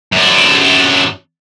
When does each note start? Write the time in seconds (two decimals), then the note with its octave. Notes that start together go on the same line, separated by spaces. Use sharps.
0.12 F#2 D4